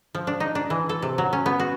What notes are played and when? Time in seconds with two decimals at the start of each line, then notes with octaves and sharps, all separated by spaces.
0.15 F3
0.27 D4
0.40 D#4
0.55 D4
0.70 E3
0.89 A4
1.02 C3
1.18 F#3
1.33 C#4
1.46 B3
1.60 F#4